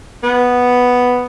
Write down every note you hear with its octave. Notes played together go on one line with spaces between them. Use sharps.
B3